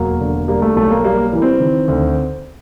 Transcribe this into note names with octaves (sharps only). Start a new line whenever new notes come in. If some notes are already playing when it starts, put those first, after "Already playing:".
Already playing: E1 F#3 A#3
D3
G3 A#3
A3
B1 A3
A#3
G3 A#3
E3
C4
D#3
D2